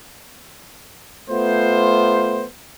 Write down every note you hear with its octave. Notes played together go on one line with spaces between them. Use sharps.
A3 B3 F4 C5